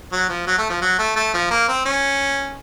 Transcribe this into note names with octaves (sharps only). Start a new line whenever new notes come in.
F#3
F3
F#3
A3
F3
F#3
A3
A3
F3
A#3
C4
C#4